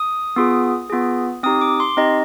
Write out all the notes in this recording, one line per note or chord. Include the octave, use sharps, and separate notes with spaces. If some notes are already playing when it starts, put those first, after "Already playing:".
Already playing: D#6
B3 F4 G#4
B3 F4 G#4
C4 D#4 G4 D#6
D6
C6
C4 D#4 G4 D#5